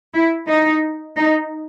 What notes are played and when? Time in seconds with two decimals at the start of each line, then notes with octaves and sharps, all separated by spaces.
0.14 E4
0.48 D#4
1.18 D#4